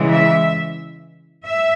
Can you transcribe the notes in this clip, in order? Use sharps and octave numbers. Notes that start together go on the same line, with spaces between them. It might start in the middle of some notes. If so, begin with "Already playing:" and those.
Already playing: C#3 E3 G#3
E5
E5